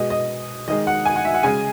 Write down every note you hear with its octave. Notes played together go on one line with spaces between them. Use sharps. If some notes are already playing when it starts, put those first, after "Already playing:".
Already playing: B2 G#3 D#5
D#5
D#3 G#3 D#5
F#5
G#5
F#5
E5
F#5
C#3 G#3 G#5